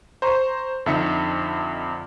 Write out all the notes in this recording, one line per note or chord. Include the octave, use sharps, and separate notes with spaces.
C5 A#5 C#6
F2 D3 D#4 E5 C#7